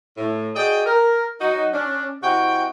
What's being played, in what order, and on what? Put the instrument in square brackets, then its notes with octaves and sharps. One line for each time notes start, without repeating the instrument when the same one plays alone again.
[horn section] A2
F#4 G#4 D5 D#5 G5
A#4
F#3 D#4 F#4
C#4 D4
C3 E4 F#4 D#5 G5